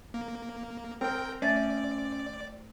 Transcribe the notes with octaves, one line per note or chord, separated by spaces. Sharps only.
A#3
C4 A#4 G5 F6
A3 C#4 D5 E5 A6